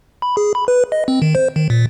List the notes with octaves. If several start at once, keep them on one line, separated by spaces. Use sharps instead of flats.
B5
G#4
B5
B4
D#5
C4
D#3
C5
D#3
A#2